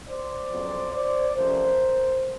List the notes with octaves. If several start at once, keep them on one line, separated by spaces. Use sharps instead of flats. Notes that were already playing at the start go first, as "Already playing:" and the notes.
C5 D5
F2 C#3 F#3 B3
C5 D5
C3 F3 A3 C#4 A#4 C5